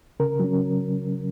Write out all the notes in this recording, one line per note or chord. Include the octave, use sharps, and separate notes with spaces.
C#3 A#4
F#3 C#4